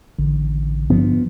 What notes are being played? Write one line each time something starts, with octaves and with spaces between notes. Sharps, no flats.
A1 D3
G2 F3 B3